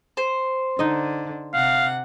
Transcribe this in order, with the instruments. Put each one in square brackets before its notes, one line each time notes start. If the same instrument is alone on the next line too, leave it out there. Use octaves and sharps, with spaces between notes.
[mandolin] C5
[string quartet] D3 [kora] D#4 D#5
[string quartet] C3 F#5 [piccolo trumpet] F5